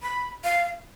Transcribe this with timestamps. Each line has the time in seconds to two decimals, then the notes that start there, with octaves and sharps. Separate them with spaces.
0.03 B5
0.44 F5